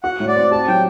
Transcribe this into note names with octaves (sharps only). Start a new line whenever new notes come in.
F#4 F#5
A2
D5
C4
G4 A5
F#3 G5